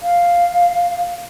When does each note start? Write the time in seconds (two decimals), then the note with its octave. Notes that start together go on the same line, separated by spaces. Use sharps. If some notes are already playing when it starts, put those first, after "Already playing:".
0.03 F5